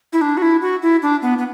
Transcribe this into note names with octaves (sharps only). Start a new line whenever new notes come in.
E4
D4
F#4
E4
F#4
E4
D4
B3
B3